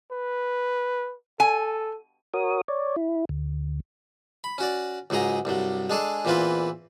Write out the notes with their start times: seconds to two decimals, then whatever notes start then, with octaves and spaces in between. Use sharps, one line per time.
0.12 B4
1.40 A4 G#5
2.34 F#4 A#4 C#5 D#6
2.68 C#5 D5
2.96 E4
3.29 D2
4.44 B5
4.58 C#4 F#4 D5
5.10 C#2 G#2 F#3 G#4 A#5
5.45 C2 G2 F#3
5.90 G#3 D4 G#4 A4
6.25 E2 A#2 E3 C4 F4 B4